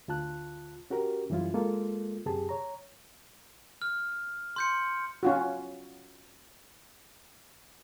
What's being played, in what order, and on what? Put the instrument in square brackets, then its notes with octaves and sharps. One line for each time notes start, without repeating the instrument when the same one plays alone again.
[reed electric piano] D2 F4 A5 F#6
C#4 F#4 G4 A#4
F#2 E3 G3 C#4 E4 F4
G#3 A#3 F4 A4
F#2 C3 G4 G#4 A5
C#5 A#5
[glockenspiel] F6
C6 G6 C#7
[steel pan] C#4 F4 F#4